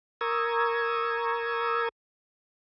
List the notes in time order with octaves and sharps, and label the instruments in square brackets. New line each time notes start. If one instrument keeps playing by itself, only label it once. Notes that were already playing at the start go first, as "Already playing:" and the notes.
[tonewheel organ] A#4 A#5 C#6 D#6 E6 G#6